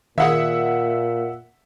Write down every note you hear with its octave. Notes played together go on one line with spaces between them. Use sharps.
A#2 D#3 G#4 E5 F#5